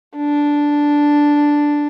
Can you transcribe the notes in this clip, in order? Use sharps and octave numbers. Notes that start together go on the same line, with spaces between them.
D4